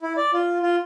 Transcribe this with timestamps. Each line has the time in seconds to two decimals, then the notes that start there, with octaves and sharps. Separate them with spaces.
0.02 E4
0.17 D5
0.33 F4
0.62 F4